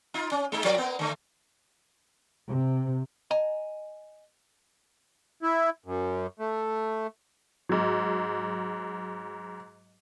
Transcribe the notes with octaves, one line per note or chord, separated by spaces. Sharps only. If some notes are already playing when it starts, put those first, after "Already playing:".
D#4 F4
C#4
G#3 D#4
F3 A#4 D5
A#3 B3
D3 A3
C3
D#5 G#5 A#5
E4
F#2
A3
G#2 F#3